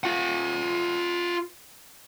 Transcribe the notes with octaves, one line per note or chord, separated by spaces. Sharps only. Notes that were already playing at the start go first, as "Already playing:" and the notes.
F4 F#5